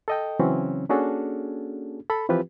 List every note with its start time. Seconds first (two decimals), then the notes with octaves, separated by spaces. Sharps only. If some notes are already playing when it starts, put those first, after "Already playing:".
0.08 A4 D#5 G5
0.39 C#3 E3 F#3 C4 C#4
0.89 A#3 C#4 D4 F#4 G#4 A4
2.10 A4 B5
2.29 E3 F3 C4 F4 G4 B4